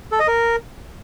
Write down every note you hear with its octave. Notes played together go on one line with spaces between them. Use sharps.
A4
D#5
A#4